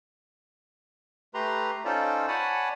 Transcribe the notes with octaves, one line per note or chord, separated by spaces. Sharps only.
A3 G4 B4 A#5 C6
C#4 D#4 F4 A4 C5 D5
C#5 D5 F#5 G#5 A5 B5